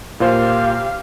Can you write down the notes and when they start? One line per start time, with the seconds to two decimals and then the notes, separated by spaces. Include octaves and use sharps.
0.20 A#2 F4 G4 C5 F5